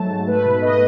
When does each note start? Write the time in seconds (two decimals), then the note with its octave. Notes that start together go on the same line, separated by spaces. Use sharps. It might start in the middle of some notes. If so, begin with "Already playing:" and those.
Already playing: G#2 F#3 A3 A5
0.10 G#2
0.27 A3 B4
0.45 B2
0.62 A3 D#5